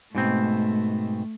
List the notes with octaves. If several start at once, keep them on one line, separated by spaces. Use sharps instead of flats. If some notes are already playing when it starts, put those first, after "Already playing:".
G#2 B2 A3 C4